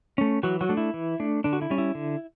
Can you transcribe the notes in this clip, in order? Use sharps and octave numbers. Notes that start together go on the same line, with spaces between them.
A3 C#4
E3 F#3 F#4
F#3 F#4
A3 D4
E4
E3
A3 D4
D3 D4
F#4
E4
G3 C#4
E4
D3